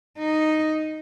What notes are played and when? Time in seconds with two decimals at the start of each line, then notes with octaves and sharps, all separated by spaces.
0.19 D#4